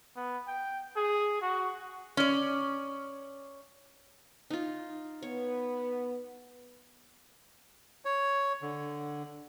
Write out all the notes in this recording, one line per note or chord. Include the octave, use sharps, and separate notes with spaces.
B3
G5
G#4
F#4
C#4 D5
D#4 F4
B3 C#5
C#5
D3